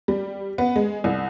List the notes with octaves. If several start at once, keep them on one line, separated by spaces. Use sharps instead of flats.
G3
B3
G#3
C2